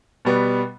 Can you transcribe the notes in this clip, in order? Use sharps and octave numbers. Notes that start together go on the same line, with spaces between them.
B2 G3 B3